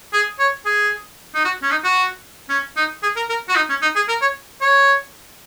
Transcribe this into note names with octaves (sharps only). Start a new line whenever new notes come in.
G#4
C#5
G#4
D#4
F#4
C#4
D#4
F#4
C#4
D#4
G#4
A#4
A#4
F#4
D#4
C#4
D#4
G#4
A#4
C#5
C#5